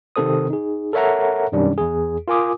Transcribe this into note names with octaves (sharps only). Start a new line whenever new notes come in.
C3 D#3 C4 A4 C5 D#6
D#4 G#4
A4 A#4 C#5 E5 F#5 A#5
F#2 B2 D#3 G3 C#4 D4
E2 G#4
F4 A#4 G#5 D6 D#6